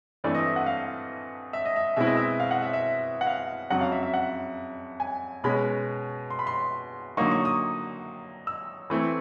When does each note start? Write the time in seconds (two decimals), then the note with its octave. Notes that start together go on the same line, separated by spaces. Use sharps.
0.24 G2 E3 A3 C4 D5
0.35 D#5
0.45 E5
0.56 F#5
0.66 F5
1.53 E5
1.65 D#5
1.76 E5
1.97 B2 G#3 C4 E4 E5
2.07 D#5
2.17 E5
2.40 F5
2.51 F#5
2.62 E5
2.73 E5
3.21 F#5
3.27 F5
3.70 F2 C#3 F#3 F#5
3.81 F5
3.92 E5
4.03 E5
4.14 F#5
5.00 G#5
5.44 B2 G#3 C#4 B5
6.30 C6
6.39 B5
6.47 C6
7.17 D3 F#3 A#3 D#4 C#6
7.31 C#6
7.45 D#6
8.47 E6
8.90 E3 A3 C4 E4